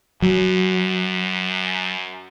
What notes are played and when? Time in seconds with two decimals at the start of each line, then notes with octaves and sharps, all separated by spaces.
0.22 F#2 F#3